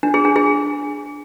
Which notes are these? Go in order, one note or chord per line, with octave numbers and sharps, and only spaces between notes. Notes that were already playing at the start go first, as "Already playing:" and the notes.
D4
G#4
D4
G#4